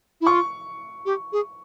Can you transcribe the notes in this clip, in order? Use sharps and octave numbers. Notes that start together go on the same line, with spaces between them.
E4
F4 C#6
G4
G#4